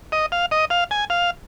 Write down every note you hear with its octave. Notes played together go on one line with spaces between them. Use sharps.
D#5
F5
D#5
F5
G#5
F5